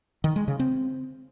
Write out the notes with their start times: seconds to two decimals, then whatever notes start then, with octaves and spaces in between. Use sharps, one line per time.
0.24 D#3
0.36 G#3
0.48 C#3
0.59 C4